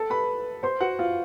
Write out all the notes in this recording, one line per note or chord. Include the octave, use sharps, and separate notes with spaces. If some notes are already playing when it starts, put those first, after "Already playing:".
Already playing: A4 A5
B4 B5
C5 C6
F#4 F#5
F4 F5